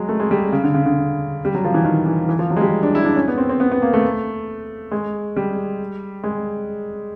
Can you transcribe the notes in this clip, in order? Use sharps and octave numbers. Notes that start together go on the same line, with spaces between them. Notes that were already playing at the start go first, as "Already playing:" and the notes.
Already playing: F#3 G#3
A3
G#3
G3
C#3
D3
C#3
D3
G3
F#3
F3
E3
D#3
E3
E3
F3
F#3
G#3
G3
D4
E4
D4
C#4
B3
C4
C4
B3
B3
A#3
A3
G#3
G3
G#3